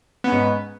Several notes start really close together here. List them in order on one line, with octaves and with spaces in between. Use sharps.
B3 C#4 G#2